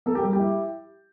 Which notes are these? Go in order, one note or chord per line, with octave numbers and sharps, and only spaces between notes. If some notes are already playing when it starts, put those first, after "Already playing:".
A#3 A4
G4
G3
G4
E4